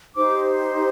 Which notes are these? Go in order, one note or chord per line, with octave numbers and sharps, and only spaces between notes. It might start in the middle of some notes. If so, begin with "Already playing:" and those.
D#4 G4 C5 D6